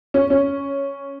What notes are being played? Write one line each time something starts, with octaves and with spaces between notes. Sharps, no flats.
C#4
C#4